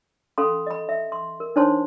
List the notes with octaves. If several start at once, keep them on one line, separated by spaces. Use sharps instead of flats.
C#4 A4 F5 B5 C6
D#5 B5
E5
C6
A#4
D4 D#4 C5 C#5 A5 C6